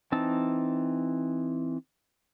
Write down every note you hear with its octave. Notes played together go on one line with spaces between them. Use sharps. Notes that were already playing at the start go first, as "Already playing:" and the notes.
E3 C4 D#4 A5 E6